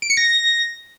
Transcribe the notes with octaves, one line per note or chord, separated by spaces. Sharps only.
D7
C#7
A#6